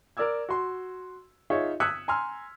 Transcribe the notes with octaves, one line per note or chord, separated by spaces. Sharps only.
A#4 D5 D6 E6 G#6
F#4 C6
D#4 F4 G#4 C#5 E5
D#6 E6 F#6 G#6 B6 C#7
G#5 A#5 C6 E6 F6